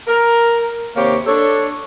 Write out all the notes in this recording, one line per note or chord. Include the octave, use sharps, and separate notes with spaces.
A#4
D#2 C3 A#3 G4 C5 C#5
D4 A4 C#5